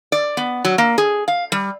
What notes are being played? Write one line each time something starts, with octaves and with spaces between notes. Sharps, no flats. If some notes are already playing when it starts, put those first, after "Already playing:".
D5
B3
F#3
A#3
G#4
F5
G3